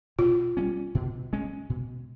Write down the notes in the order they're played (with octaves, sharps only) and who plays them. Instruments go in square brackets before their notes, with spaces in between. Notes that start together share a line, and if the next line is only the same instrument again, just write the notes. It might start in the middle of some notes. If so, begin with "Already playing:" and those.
[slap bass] B2 [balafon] F4
[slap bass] G3 A#3 C#4
B2
G#3 C#4
B2